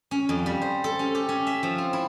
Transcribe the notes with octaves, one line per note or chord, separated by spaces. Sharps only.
C#4
F2
G3
C5
A4
C#4
G4
C#4
E5
F3
C4
E4